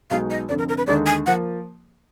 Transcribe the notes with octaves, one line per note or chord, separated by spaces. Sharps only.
B1 B2 G#3 D#4 F#4 F5
D#5
F1 F2 D3 D5
A#4
A#4
B4
D#2 D3 G#3 D#4 D5
G#5
F3 A#3 F#5